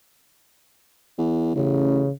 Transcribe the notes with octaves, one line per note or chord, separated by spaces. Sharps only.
E2
A1 C#3